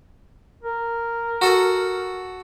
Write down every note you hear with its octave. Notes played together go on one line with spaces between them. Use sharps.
A#4
F#4 A4